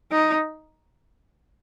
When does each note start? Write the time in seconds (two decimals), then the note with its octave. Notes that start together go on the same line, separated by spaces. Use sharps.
0.12 D#4